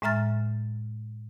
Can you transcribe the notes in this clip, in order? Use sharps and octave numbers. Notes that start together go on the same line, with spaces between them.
A2 G#3 E5 A#5 F6 A6